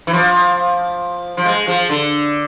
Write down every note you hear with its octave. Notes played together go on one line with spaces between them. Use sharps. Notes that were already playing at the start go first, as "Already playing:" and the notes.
E3
F3
F3
G#3
F3
D3